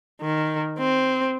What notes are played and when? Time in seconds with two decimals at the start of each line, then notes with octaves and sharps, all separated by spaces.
0.21 D#3
0.79 C4